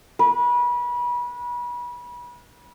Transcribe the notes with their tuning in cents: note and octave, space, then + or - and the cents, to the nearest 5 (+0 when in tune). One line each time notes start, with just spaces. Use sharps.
B4 -30